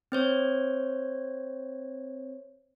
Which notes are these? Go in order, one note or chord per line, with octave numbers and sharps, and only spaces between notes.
C4 C5 C#5